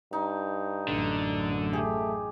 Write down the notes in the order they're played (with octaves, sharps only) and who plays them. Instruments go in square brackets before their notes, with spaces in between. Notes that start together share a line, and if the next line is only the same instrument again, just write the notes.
[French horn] G2 [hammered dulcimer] D#4
[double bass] A1 F#2 [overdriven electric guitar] D3
[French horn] A3 [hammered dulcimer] G4 G#4